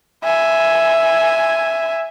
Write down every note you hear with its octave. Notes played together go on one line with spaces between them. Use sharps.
E5 G#5